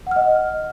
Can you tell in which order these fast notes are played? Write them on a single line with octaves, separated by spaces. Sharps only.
F#5 F6 D#5